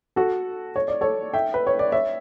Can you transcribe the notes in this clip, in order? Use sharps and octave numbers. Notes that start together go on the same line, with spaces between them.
F#4 A4
C#5
D5
A4 C#5
E5 G5
B4
C#5
D5
C#5 E5